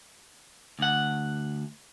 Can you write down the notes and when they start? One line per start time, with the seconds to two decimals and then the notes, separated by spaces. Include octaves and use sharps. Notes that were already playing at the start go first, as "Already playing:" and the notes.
0.79 D2 F#5